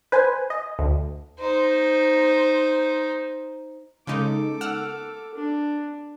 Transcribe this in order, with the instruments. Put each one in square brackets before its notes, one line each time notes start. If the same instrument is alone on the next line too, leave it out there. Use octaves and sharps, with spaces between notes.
[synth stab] B4 C5 G#5
D#5
D2
[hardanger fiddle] D#4 C5
[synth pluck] C#3 G#3 D#4 [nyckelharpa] A4 D6
[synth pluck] F#5 E6 F6
[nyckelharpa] D4